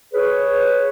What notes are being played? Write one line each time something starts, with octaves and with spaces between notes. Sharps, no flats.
G#4 B4 C#5